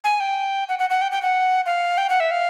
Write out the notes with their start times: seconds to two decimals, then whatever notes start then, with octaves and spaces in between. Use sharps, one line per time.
0.04 G#5
0.20 G5
0.69 F#5
0.79 F#5
0.90 F#5
1.02 G5
1.12 G5
1.22 F#5
1.66 F5
1.98 G5
2.09 F#5
2.20 E5
2.31 F5